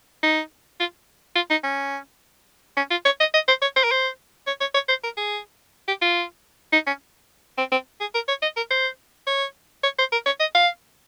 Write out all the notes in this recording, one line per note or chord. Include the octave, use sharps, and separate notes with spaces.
D#4
F4
F4
D#4
C#4
C#4
F4
C#5
D#5
D#5
C5
C#5
C5
A#4
C5
C#5
C#5
C#5
C5
A#4
G#4
G4
F4
D#4
C#4
C4
C4
G#4
A#4
C#5
D#5
A#4
C5
C#5
C#5
C5
A#4
C#5
D#5
F5